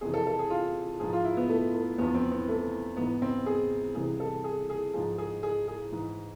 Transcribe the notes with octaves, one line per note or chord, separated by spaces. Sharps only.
F2 C3 E3 G#4
A4
A4
G#4
F4
G#2 F3 G#4
F4
E4
B3
A3
A3
E2 D3 F3 B3
C4
B3
A3
G#2 E3 B3
C4
G#4
C2 C3 E3 G#4
A4
G#4
G#4
G#2 F3 G#4
G#4
G#4
G#4
G#2 E3